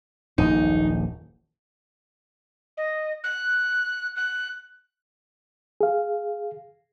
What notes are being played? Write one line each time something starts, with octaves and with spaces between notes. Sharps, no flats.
D#1 A#1 F#2 D#4
D#5
F#6
F#6
G#4 F5